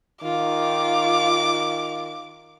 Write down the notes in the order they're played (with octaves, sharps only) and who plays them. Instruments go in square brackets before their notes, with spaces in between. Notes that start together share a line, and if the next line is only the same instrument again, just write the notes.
[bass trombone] D#3 [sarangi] F4 [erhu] D6